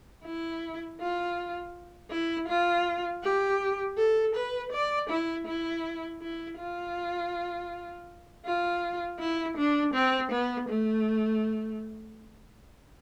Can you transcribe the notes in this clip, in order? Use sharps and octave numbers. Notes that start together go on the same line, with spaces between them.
E4
F4
E4
F4
G4
A4
B4
D5
E4
E4
E4
F4
F4
E4
D4
C4
B3
A3